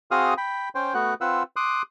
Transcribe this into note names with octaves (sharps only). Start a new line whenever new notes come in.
C4 F#4 G#4 F5 D#6 F6
G5 B5
C#4 C5 G5
A3 B3 F#4 F#5 F#6
C4 F4 B4 F#5 E6
C6 D6 D#6 F#6